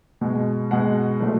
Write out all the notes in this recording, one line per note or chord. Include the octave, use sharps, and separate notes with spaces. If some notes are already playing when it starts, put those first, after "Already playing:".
B2 G#3
B2 G#3 F#5
A#2 F#3 A3